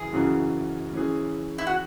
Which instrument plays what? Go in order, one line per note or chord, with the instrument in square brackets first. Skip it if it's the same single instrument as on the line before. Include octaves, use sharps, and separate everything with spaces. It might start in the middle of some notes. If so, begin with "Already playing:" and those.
Already playing: [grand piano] F#2 C#3 E3 [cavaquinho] G#4
[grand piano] F#2 C#3 E3 C#4 F#4
E3 C#4 G#4
[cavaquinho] E4
F#4